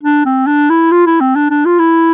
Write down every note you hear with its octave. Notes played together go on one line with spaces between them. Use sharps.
D4
C4
D4
E4
F4
E4
C4
D4
D4
F4
E4